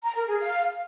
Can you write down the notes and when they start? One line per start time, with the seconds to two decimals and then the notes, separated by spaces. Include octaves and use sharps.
0.04 A#5
0.16 A#4
0.28 G#4
0.39 F5